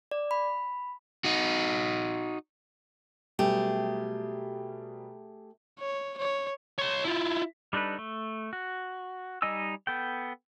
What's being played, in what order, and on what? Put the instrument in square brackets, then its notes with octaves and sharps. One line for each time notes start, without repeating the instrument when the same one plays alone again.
[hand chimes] D5
B5
[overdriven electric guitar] D#4 F#4
[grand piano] B2 F#3 G3 [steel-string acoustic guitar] A3 G4 G#4
[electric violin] C#5
C#5
[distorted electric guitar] C#5 C6
E4 F4
[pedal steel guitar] G3 D4 D#4 A4 B4
A3
F#4
G3 D#4 D#5 G#5 E6
B3 A4 G5